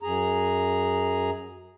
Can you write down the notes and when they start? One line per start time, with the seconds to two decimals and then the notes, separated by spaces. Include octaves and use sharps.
0.03 F#2 G#4 A#5